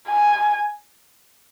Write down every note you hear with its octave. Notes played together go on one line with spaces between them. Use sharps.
G#5